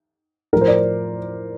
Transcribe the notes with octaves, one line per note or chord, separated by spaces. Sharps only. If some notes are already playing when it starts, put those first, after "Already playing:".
A2 F3 A#4
C5
D5